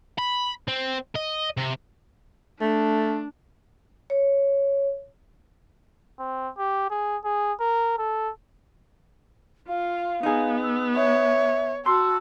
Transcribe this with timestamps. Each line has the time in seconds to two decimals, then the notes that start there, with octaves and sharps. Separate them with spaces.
0.19 B5
0.68 C4
1.16 D#5
1.57 C3
2.61 A3 D4
4.10 C#5
6.19 C4
6.58 G4
6.90 G#4
7.24 G#4
7.60 A#4
7.98 A4
9.68 F4 F5
10.23 B3 D#4 G#4
10.63 E6
10.96 C#5 E5
11.86 F#4 A5 C6 E6